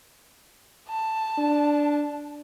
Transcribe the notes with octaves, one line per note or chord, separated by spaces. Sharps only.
A5
D4